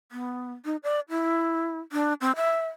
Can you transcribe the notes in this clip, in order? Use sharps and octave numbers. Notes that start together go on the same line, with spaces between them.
B3
D#4
D5
E4
D4
C4
E5